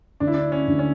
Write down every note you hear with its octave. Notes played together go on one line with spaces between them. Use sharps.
D2 D4
E4
D4
C#4
D2
C#4